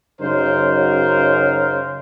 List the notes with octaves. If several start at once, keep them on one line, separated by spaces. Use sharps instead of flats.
F#2 C#3 F#3 D#4 A#4 C5